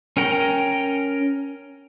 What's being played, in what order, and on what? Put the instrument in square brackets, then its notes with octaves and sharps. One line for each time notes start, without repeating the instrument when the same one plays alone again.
[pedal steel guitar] C#4 A#4 G5 A#5